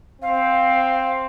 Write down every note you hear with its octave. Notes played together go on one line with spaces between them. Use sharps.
C4 F5